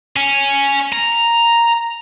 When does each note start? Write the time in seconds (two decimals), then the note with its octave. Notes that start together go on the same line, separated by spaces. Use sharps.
0.16 C#4
0.92 A#5